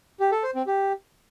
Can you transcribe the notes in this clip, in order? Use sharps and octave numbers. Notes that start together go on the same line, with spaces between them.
G4
A4
C5
C4
G4